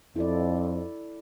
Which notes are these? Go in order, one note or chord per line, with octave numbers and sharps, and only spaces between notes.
F2 E4 A4 D5